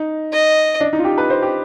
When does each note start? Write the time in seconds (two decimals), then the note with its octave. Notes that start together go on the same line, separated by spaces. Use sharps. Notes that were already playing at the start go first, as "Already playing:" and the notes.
Already playing: D#4
0.32 D#5
0.80 D4
0.93 D#4
0.99 F4
1.05 G4
1.18 B4
1.30 C5
1.42 G4